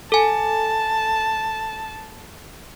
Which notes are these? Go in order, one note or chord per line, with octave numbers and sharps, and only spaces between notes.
A4 G#5 A5